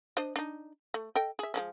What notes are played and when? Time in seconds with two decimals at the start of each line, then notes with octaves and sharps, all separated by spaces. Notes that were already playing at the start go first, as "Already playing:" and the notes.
0.17 D4 C5 D#5
0.36 D4 D#4
0.94 A3
1.16 A4 D#5 G5
1.39 G#4 E5
1.54 F3 G#3 C#4